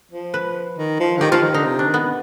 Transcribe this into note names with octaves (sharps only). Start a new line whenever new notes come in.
F3
B4
D#3
F3
D3
D#3 G4
F3 F4
D#3
D3 D#4
C3
D4
D#3
B3